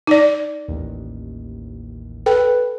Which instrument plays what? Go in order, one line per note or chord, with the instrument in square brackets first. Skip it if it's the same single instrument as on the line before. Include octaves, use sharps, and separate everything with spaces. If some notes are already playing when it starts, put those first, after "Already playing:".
[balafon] D#4 D5
[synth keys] A1 D#2
[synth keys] A4 B4 [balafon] G5